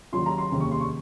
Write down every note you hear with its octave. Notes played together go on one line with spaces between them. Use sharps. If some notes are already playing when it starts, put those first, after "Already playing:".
D#2 C#3 F#3 C6
A#5
C6
F1 D#2 C#3
C#6
C6
C#6